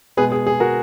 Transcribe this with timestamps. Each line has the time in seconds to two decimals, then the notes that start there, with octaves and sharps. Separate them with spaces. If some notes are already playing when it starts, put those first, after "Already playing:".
0.17 B2 G#3 B3 G#4 B4
0.32 G#4
0.47 G#4
0.60 F#4 A#4